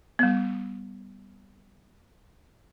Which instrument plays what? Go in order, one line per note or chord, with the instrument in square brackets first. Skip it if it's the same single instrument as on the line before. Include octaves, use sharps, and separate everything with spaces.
[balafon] G3 B3